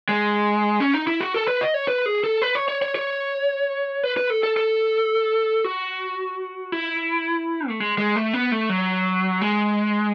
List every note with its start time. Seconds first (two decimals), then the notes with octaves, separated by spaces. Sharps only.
0.09 G#3
0.80 C#4
0.94 D#4
1.07 E4
1.21 F#4
1.34 A4
1.48 B4
1.61 D#5
1.74 C#5
1.88 B4
2.06 G#4
2.24 A4
2.42 B4
2.55 C#5
2.68 C#5
2.82 C#5
2.95 C#5
4.04 B4
4.17 B4
4.30 A4
4.43 A4
4.57 A4
5.64 F#4
6.72 E4
7.68 A3
7.80 G#3
7.98 G#3
8.16 A3
8.33 B3
8.52 A3
8.69 F#3
9.41 G#3